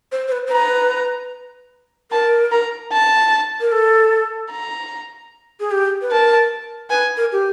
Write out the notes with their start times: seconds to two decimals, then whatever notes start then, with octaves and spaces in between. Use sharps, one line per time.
0.12 C5
0.28 C5
0.32 B4
0.47 C5
0.52 B4 A#5
2.11 A#4 A5
2.52 A#5
2.92 A5
3.61 A#4
3.72 A4
4.51 A#5
5.60 G#4
5.71 G4
6.02 B4
6.11 A#4 A5
6.90 B4 G#5
7.17 A#4
7.32 G4